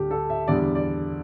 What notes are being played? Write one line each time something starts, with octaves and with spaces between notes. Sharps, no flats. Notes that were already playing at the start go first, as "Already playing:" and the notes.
Already playing: D2 D3 G3 G4 A4
A4
E5
E2 D3 G3 D5
D5